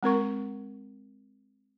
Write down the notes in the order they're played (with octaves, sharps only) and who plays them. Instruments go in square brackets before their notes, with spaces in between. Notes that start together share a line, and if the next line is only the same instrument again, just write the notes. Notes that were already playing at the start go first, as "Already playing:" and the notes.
[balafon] G#3 C4 A#4 C#6